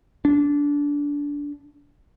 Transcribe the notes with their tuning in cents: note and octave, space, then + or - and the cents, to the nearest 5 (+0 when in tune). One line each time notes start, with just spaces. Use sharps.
D4 -20